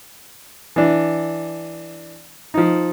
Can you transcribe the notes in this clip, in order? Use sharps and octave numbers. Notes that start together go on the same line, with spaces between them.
E3 D4
F3 D#4